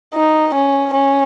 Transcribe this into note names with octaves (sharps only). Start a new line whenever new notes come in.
D#4
C#4
C#4